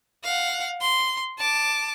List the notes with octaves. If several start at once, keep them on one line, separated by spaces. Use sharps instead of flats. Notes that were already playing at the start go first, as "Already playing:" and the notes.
F5 F#5
C6
A5 D6